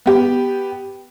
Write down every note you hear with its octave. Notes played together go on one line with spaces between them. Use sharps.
B3 G4